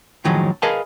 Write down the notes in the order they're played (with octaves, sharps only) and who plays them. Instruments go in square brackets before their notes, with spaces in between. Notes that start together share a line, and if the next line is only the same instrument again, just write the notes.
[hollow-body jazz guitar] F#2 A2 D#3 F3 F#3 G#3
G#4 A#4 B4 D#5 F5 A5